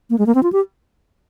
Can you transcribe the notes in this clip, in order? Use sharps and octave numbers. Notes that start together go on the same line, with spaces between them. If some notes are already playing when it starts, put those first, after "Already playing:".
A#3
G#3
A#3
C4
F4
G4